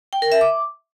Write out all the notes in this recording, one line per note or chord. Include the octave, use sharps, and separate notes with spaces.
G5
A#4
E5
D6